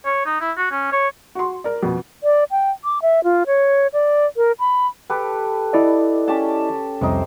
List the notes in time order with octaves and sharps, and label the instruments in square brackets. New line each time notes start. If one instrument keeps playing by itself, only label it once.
[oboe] C#5
D#4
E4
F#4
C#4
C#5
[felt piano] F#4 C6
A#4 D5
F2 B2 F3
[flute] D5
G5
D6
E5
F4
C#5
D5
A#4
B5
[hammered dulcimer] G4 A4 B4
[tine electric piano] E4 D5 D#5
[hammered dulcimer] C#4 G4 A5
[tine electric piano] C2 F2 [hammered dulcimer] C3 D#4 C5